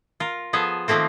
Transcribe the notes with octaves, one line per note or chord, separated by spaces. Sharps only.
F4 A#4
F3 B3 G#4 A4
D#3 F3 A3 A#3 C4